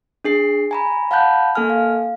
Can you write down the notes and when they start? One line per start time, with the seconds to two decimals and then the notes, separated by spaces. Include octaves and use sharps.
0.25 D4 G#4 C7
0.71 G#5 A#5 B5
1.11 F5 F#5 A5 B5 F#6 G6
1.55 A#3 A4 G#5 F6
1.70 F5